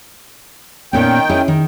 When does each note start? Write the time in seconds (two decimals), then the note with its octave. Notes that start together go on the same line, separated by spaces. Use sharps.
0.93 A#2 D#3 B3 C#4 G5
1.29 C#4 E4 G#4
1.48 D#3